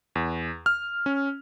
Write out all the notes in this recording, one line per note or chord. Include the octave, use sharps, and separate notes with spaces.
E2
F6
C#4